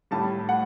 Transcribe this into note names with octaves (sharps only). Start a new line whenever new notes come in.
A2 G3 A5
F#5